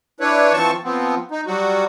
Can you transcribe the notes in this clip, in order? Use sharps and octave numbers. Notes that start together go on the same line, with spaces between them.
D4 E4 B4 C#5
E3 F3 C4 A5 C#6
F3 B3 C4
D#4
F#3 G3 F#4